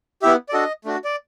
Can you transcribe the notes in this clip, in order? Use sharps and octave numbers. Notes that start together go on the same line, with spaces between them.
B3 E4 G4 E5
D5
D4 F#4 A4 D#5
A3 D4 F#4
D5